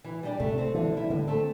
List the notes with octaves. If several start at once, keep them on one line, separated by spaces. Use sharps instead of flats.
E3
G3 D4 G4 D5
C3 A3
C4 A4 C5
D3 E3
G3 E4
A2 D3
A3 C4 A4